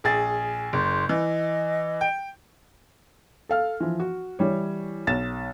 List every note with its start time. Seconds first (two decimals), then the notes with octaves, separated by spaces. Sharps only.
0.04 A#1 G#4 A6
0.73 F#1 C6
1.09 E3 D#5
2.01 G5
3.49 A4 F5 F6
3.80 E3 F3
4.00 F#4
4.39 E3 G3 C#5
5.07 B1 A6 E7